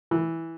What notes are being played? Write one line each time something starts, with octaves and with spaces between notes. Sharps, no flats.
E3